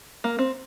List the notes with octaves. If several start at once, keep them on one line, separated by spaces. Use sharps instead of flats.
A#3
C4